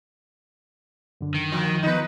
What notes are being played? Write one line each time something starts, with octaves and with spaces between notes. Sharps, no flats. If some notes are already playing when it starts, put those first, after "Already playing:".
F#2 D3
D#3
F3 A#3
F3 B3 D#4 B4